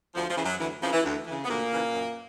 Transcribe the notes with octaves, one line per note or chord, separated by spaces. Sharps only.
D2 F3
F3
C#3 E3
F#2 F#3
D2 E3
C#3 E3 F3
E3
D2
C#3 E3
B3
D2 A#2 A#3
C#3 E3
F#2